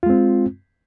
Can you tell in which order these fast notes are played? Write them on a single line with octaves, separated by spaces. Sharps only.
F4 G#3 C4